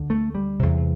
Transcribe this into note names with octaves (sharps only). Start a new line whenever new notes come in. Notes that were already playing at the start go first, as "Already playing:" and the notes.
Already playing: D2 D3
A3
G3
E2 C3